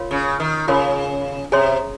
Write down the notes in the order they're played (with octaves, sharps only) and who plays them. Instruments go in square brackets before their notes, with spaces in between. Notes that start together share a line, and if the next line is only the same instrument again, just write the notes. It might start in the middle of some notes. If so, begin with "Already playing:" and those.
Already playing: [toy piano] F4 A#4 C#5 F5 C6
[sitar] C#3
D#3
[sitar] C#3 [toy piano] F4 A#4 C#5 F5 C6
[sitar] C3 [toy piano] G#4 C#5 G#5 C6